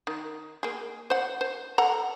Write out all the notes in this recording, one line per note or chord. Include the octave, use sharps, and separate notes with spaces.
D#3
A#3 G#4
C5 F#5
C5
A4 F#5 A#5